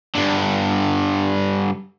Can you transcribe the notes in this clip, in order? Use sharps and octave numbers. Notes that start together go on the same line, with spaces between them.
G2 D3